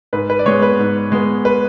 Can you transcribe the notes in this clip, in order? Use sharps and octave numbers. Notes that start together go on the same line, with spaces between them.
G#2 B4
B4
D5
G#3 B3 C#5
B4
G#2
G#3 B3
B4